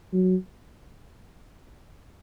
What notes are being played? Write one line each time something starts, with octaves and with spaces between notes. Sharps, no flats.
F#3